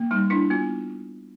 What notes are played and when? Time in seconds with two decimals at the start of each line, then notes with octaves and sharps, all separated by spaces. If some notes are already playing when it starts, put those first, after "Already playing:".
Already playing: A#3
0.11 G3 D#4
0.30 D4 E4
0.50 B3 F4